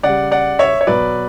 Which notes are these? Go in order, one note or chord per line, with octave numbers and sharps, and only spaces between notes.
C#3 G3 D5 F#5
D5 F#5
C#5 E5
C#5
B2 F#3 B4 D5